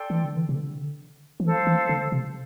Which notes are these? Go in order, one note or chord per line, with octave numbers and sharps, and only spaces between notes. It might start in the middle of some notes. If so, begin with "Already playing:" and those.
Already playing: A4 D5 G5 C6
E3
D3
E3
C3
D3
F3
E3 A4 C5 F5
E3
D3
C3